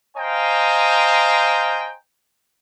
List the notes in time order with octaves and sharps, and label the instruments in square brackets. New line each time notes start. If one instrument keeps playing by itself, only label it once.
[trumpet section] C5 D#5 F5 G5 G#5 A#5